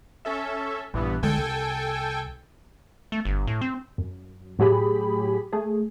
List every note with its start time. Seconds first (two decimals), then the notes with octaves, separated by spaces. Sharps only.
0.25 C#4 A4 E5
0.94 A#1 G2 E3 B3
1.23 B1 D3 G#3 A4 G5 G#5
1.38 C2
3.12 A3
3.25 G1
3.47 A2
3.61 C4
3.98 F#2
4.59 A2 F#3 G4 G#4 B5
5.53 A3 G#4